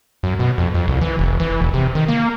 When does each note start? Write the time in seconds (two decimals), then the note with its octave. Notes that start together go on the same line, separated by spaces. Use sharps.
0.23 F#2
0.39 B2
0.58 F2
0.74 F2
0.88 C2
1.01 E3
1.19 F1
1.40 E3
1.61 E1
1.74 C3
1.95 D#3
2.08 A#3